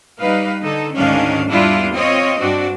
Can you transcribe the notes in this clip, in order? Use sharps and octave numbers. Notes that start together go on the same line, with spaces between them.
G3 D#4 B4 F5
D3 D#4 A4
D2 G#2 D#3 C#4 D4 F5
E2 G3 D4 E4 F4
C4 F4 C#5 D#5
G2 C4 D4 F#4